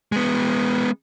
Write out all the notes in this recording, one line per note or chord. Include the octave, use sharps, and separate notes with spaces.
G#3 B3